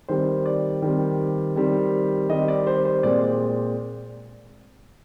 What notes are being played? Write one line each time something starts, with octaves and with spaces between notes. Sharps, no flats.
D#3 G3 C4 C5
D5
D#3 G3 C4
D#3 G3 C4
D#3 G3 C4 D#5
D5
C5
C5
A#2 G#3 C4 D5